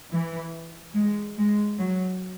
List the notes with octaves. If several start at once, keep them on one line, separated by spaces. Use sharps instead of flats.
E3
G#3
G#3
F#3